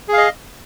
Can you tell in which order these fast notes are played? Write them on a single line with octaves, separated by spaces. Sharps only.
G#4 F5 D#5